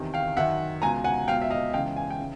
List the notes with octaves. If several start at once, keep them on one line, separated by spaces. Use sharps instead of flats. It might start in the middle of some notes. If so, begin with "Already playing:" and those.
Already playing: E2 C3 D#3
F5 G5
F#2 D#3 E5 F#5
C#2 B2 G#5 A#5
F#5 G#5
C#2 B2 F5 G5
E5
D#5 F5
C#2 C#3 E3 F5 G5
G#5
G5
C#3 E3